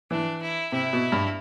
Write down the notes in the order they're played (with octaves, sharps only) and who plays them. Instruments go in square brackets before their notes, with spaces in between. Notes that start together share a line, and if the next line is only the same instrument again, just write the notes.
[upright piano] E3 [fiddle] D4
[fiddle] E4
[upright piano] C3 [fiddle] E4
[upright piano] B2
G2